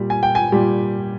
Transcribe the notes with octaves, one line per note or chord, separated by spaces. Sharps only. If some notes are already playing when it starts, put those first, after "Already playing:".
Already playing: A#2 G3
G#5
G5
G#5
A#2 G3